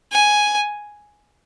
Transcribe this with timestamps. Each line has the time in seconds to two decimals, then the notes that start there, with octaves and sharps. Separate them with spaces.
0.12 G#5